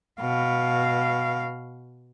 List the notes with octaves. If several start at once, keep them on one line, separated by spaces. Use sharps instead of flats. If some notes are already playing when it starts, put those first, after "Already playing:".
B2 F5